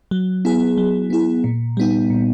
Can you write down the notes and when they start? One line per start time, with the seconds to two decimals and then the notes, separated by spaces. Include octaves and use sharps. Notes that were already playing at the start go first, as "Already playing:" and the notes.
0.11 F#3
0.45 B3 E4 G#4
0.78 F#3
1.10 B3 E4 G#4
1.44 A#2
1.77 G3 B3 D#4
2.10 A#2